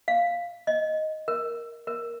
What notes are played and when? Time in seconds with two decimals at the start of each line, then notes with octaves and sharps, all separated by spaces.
0.08 F5
0.67 D#5
1.28 A#4
1.87 A#4